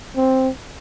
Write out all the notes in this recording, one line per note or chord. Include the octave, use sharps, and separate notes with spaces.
C4